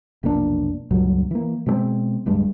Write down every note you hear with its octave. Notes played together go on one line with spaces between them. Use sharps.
F1 B1 A#3 D4
C#2 G2 A#2 F#3
E3 A#3
B2 G#3 A3 C4
D1 G2 G#3